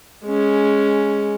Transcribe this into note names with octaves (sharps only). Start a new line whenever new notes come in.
G#3 C#4